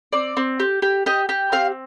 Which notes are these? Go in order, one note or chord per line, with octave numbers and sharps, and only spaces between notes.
C4 D5
C4
G4
G4
G4 D#5
G4
C4 F5